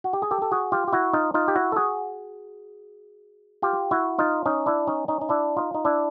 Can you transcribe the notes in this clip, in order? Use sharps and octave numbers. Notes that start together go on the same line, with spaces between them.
F#4
G4
G#4
G4 A4
A4
F#4 G#4
F4 G4
G4
E4 F#4
D#4 F4
D#4 F4
G4
E4 F#4
A4
F#4 G#4
F4 G4
E4 F#4
D#4 F4
C#4 D#4
D4 E4
C#4 D#4
C#4 D#4
D#4
D4 E4
D#4 F4
D#4
D4 E4